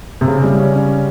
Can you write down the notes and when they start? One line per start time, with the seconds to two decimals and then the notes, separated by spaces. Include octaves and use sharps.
0.21 C3
0.28 C#3
0.44 G3
0.60 C#4
0.75 C#4